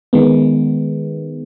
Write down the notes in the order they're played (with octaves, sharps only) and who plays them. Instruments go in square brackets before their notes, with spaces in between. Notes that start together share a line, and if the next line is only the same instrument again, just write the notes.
[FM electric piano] D#3 G#3 B3